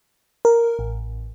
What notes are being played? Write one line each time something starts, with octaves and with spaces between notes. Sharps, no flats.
A#4
A1